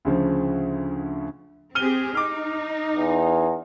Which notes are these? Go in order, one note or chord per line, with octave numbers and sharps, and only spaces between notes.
D2 C#3 F3
C4 G4 G#4 F6 D#7 G7
D#4 D6 F6
E2